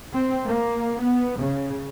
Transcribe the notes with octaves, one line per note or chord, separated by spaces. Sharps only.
C4
A#3
B3
C#3